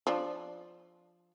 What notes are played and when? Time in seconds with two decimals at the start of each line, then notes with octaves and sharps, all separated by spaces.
0.07 F3 D4